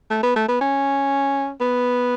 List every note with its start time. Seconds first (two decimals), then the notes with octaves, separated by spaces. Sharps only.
0.10 A3
0.23 B3
0.36 A3
0.48 B3
0.61 C#4
1.61 B3